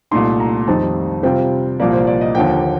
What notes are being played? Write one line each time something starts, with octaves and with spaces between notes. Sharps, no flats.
C2 A#2 A3 D#4 C6
A#5
F2 D#3 G3 C4 D#4 A5
C3 G3 C4 F4 G5
C2 A#2 F3 A#3 D5
C5
D5
D#5
D#2 D3 F3 A#3 G5